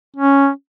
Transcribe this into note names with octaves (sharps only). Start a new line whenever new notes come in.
C#4